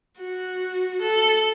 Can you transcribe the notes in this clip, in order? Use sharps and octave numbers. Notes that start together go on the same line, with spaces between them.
F#4
A4